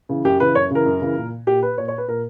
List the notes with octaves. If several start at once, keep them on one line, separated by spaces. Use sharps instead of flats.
C#3 E3
F#2 G4
C#3 E3 B4
F#2 C#5
C#3 E3 A#4
F#2
C#3 E3
A#2
A#2 G4
B4
A#2 C#5
C#5
B4
A#2 A#4